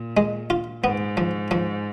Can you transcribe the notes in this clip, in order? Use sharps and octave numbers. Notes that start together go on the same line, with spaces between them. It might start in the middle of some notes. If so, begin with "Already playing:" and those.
Already playing: A#2
G#3
F4
G#2 B3
F3
F3